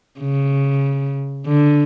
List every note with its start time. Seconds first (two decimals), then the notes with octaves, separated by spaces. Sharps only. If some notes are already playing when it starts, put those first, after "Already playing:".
0.20 C#3
1.47 D3